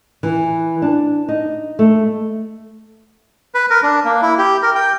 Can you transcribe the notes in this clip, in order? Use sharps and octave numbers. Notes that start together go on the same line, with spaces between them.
E3
D4
D#4
A3
B4
A#4
D4
A#3
E4
G4
A#4
G5